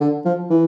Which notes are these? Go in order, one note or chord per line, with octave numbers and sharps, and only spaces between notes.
D3
F3
E3